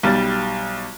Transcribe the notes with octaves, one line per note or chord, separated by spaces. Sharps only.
B1 G3 A6